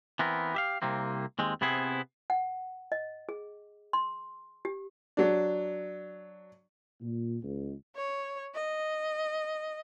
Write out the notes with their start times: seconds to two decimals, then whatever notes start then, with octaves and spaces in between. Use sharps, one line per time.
0.19 E3 B3 C4 A#4
0.54 G4 E5 F5
0.82 C2 C3 A#3 C4
1.39 D#2 G#3 C4
1.61 C3 B3 C4 E4 G#4
2.30 F#5
2.92 D#5
3.29 G#4
3.93 C6
4.65 G4
5.17 F#3 D4
7.01 A#2
7.43 C#2
7.96 C#5
8.55 D#5